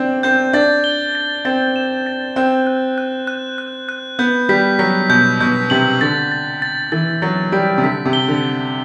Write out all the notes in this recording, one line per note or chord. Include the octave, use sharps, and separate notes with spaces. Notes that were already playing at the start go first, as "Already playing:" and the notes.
Already playing: C4 D4
C4 G6
D4 A6
G7
A6
C4 A6
E7
A6
C4 F#6
F#6
F#6
F#6
F#6
F#6
B3 G6
G3 B6
F#3 B6
B2 G6
B2 G6
C3 F#7
D3 A6
A6
A6
E3 A6
F#3 A6
G3 D7
C3
D3 B6
C3
G7
D3
G7